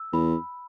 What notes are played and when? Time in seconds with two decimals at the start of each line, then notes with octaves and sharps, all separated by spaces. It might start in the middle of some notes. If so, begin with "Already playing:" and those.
Already playing: E6
0.13 E2 B5